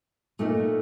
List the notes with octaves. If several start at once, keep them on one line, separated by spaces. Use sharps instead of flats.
A#2 A3 D#4